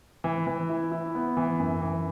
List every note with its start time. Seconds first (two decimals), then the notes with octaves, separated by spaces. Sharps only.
0.24 E3
0.47 E3
0.69 E4
0.92 E4
1.15 B3
1.37 E3
1.59 F#2
1.82 E3